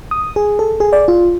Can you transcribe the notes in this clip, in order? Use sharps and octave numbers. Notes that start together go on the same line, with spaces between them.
D#6
G#4
A4
G#4
D5
F4